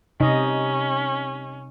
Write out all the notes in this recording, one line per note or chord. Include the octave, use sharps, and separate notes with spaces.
C3 C#4 D#4 D#5